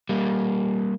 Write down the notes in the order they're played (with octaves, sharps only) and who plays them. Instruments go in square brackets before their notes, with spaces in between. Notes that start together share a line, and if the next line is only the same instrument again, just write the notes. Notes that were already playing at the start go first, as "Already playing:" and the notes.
[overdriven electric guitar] G3 A#3